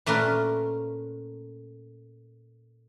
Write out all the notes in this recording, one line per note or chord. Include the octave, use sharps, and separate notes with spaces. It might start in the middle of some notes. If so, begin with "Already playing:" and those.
A#2 A3 C#4 A#4 B4